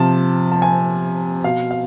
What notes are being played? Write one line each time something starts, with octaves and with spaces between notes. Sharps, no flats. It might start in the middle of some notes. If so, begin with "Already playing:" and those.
Already playing: C3 F3 A5
A5
G#5
B2 F5
F5